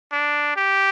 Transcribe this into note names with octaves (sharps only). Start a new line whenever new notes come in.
D4
G4